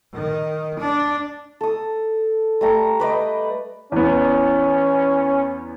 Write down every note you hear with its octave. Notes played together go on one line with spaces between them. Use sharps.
D#3
D4
A4 D#6
G3 A3 A#5
B4 D5 D#5 G5
E2 B3 C#4